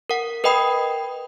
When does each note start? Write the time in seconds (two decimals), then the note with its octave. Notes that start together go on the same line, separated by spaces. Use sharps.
0.10 A#4 F#5
0.44 A#4 B4 D#5 G5 B5 D#6